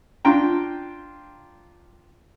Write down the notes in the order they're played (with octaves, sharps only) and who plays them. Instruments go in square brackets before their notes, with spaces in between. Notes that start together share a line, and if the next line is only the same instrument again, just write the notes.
[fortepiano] D4 F4 G5 A#5